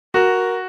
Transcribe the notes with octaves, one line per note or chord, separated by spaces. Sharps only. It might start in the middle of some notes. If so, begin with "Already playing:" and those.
F#4 A#4